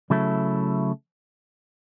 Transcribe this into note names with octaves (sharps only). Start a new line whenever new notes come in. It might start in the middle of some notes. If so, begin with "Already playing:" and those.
C#3 F#3 A3 E4 A4